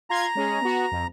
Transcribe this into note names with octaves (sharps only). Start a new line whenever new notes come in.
F4 A#5 C6 G#6
G#3 C#4 G#4
B3 F#4
F2